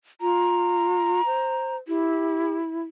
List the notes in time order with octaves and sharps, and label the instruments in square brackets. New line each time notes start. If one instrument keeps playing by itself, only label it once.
[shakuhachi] F4 [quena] A#5
[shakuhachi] C5
[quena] E4 [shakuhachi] G4